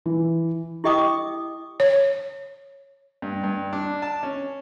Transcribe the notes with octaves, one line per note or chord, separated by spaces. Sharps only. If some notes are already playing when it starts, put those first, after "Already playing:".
E3
E4 G4 D#5 G5 D6 D#6
C#5
G2
G2
D4
A5
C#4